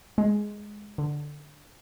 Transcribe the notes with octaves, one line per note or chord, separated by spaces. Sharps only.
G#3
D3